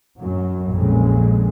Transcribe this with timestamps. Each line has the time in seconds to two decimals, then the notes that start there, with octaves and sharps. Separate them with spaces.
0.18 F#2 F#3
0.70 A#1 F2 A#2 C#3 G#3